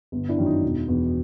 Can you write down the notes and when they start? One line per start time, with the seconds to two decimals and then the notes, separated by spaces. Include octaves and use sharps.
0.12 G1
0.29 D4 E4
0.37 F#2 D#3
0.46 D#4
0.63 E1
0.88 E2 B2